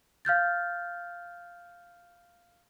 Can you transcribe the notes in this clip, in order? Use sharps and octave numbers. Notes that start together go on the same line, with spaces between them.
F5 F6 G6 A6